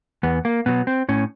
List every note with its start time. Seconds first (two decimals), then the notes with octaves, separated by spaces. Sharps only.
0.23 E2 B3
0.45 A#3
0.66 B2 F#3 B3
0.87 C4
1.09 A2 C#4